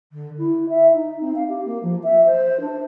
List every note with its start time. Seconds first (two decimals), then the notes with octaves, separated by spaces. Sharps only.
0.12 D3
0.38 E4
0.69 E5
0.94 D#4
1.21 C4
1.35 F5
1.48 G4
1.65 A#3
1.83 F3
2.04 E5
2.26 C5
2.61 D4